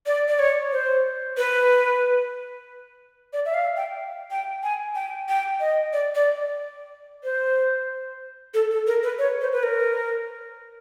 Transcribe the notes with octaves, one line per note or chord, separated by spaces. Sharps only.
D5
D5
C#5
C5
B4
D5
E5
F5
G5
G5
G#5
G5
G5
D#5
D5
D5
C5
A4
A4
A#4
B4
C#5
C5
B4
A#4